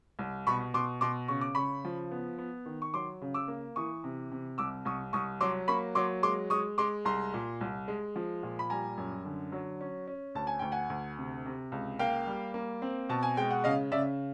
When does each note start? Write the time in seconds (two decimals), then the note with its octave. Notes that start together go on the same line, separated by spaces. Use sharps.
0.19 C2
0.47 B2 B5 C#6
0.74 B2 C6 D6
1.01 B2 C6 D6
1.28 C#3 C#6
1.41 D6
1.55 C#3 B5 C#6
1.85 F3
2.11 B3
2.38 B3
2.66 D#3
2.82 C#6
2.94 F#3 C6 D6
3.22 C#3
3.34 D6 E6
3.48 A#3
3.76 E3 C#6 D#6
4.04 C3
4.31 C3
4.58 C2 D6 E6
4.85 C2 C#6 D#6
5.13 C2 C#6 D#6
5.41 F#3 C6 D6
5.68 A#3 B5 C#6
5.95 F#3 C6 D6
6.23 G#3 C6 D6
6.50 G#3 C#6 D#6
6.78 G#3 C6 D6
7.05 C2 A#5 C6
7.34 A#2
7.61 C2
7.88 G#3
8.16 F3
8.43 A#2
8.59 B5
8.70 G3 G#5 A#5
8.97 F#2
9.25 D3
9.52 F#3
9.81 C#4
10.07 C#4
10.35 D2 A5
10.47 G#5
10.59 D2 G5
10.72 F#5 G#5
10.90 D2
11.18 C3
11.45 C3
11.72 C#2
11.99 A#3 F5 G5
12.27 G3
12.54 A#3
12.82 C4
13.09 B2 A5
13.23 G#5
13.37 G#3 G5
13.50 F#5
13.64 C#3 D#5 F5
13.92 C#3 D5 E5